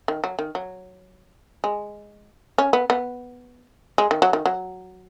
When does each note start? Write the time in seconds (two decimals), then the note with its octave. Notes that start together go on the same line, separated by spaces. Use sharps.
0.08 D#3
0.24 F#3
0.39 D#3
0.55 F#3
1.64 G#3
2.58 C#4
2.73 B3
2.90 B3
3.98 G#3
4.11 D#3
4.22 F#3
4.33 D#3
4.46 F#3